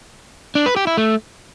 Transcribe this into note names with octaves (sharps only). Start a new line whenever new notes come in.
D4
B4
G4
E4
A3